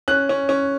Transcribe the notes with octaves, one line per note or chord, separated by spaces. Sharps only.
C#4 F#6
C#4
C#4